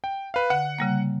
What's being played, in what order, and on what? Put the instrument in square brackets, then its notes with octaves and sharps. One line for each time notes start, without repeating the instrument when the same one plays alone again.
[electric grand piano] G5
B4 F5
[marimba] D3 [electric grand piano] F#5
[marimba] C#3 G3 A#3